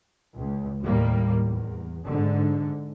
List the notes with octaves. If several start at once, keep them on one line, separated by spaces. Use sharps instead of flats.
C#2
D#2 A2 G3 A#3
E2
G#2 D3